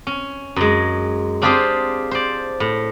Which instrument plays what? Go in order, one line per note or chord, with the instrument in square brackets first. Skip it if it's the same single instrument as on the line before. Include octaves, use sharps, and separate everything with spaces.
[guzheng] C#4
F#2 G#3
C4 D4 F4 G4 G#4 C5
C5 D5
A2